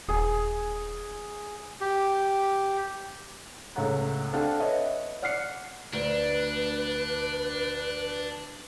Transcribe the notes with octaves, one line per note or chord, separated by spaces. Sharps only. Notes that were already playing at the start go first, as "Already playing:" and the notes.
D#1 G#4
G4
C#2 A2 A4 C#5 F#5 A#5
C4 D4 A4 F5 F#5 A5
B4 C#5 D#5 E5
D5 F#5 F6 F#6 C7 C#7
D2 D4 B4